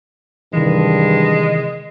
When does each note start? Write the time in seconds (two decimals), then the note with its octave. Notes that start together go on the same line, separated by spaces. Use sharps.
0.53 G2 C3 D#3 E3 G#3